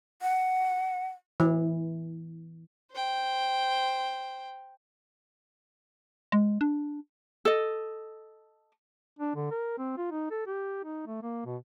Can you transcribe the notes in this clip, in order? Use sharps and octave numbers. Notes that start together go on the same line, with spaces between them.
F#5
E3
C5 G5
G#3
D4
A4 D#5
D4
D3
A#4
C4
F4
D#4
A4
G4
D#4
A3
A#3
B2